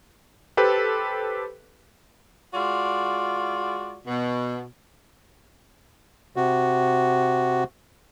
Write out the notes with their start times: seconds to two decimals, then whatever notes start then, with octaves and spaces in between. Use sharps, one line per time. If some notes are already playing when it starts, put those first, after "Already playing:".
0.57 G4 A4 B4 C5
2.54 G#3 F4 F#4 D5
4.07 B2
6.36 C3 F#4